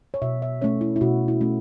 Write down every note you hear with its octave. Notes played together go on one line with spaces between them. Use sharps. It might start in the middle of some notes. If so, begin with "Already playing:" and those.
C#5
B2 E5
E5
A3 C#4 C#5
E4
E4
B2 F#4
E4
A3 C#4